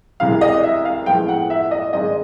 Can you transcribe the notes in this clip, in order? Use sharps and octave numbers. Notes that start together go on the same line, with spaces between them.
C2 C3 E3 G#3 F5
D#5
E5
F5
A2 F3 G#3 B3 G5
F#5
E5
D#5
G#2 D#3 G#3 C4 D#5